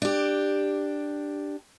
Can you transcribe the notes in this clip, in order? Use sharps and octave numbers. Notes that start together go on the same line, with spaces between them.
D4 G4